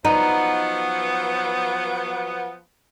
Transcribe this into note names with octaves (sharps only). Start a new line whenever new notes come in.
F3 F#3 B3 D#4